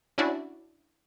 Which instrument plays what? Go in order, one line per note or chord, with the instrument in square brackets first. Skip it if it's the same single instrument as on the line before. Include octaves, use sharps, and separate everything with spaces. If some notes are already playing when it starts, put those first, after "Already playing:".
[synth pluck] C#4 D4 E4 F#4 D5